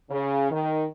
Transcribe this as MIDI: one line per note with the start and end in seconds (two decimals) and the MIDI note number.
0.10 0.50 49
0.51 0.84 51